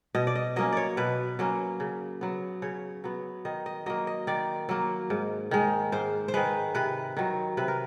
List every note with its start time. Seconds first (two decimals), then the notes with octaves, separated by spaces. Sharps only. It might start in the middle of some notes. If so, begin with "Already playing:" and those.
0.15 B2 D#5
0.27 D5
0.35 D#5
0.56 F#3 A#3 C#4 D#5
0.72 C#5 D5
0.97 B2 B4
1.39 F#3 A#3 C#4
1.80 C#3
2.21 F#3 B3
2.62 C#3 C#5
3.04 F#3 B3
3.45 D#3 D#5
3.66 D#5
3.86 F#3 A#3 D#5
4.07 D#5
4.27 D#3 D5
4.69 F#3 A#3
5.10 G#2
5.51 D#3 G#3
5.92 G#2 C5
6.28 C5
6.34 D#3 G#3 B4
6.75 C3 B4
7.17 D#3 F#3
7.57 C3 B4
7.68 A#4